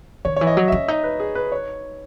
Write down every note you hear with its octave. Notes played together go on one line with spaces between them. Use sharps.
D#3 C#5
E3 C#5
D#5
F#3
C#4 E5
D#4 D#5
B4
G#4
B4
C#5